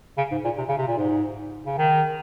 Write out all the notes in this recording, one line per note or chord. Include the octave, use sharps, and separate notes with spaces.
C#3
G#2
A#2
C3
C#3
C3
A#2
G#2
C#3
D#3